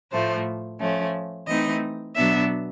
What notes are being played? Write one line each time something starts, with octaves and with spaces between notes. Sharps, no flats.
A2 F3 A3 C5
F3 A3 C#4
E3 A3 C4 D#4 D#5
B2 F#3 B3 D4 E5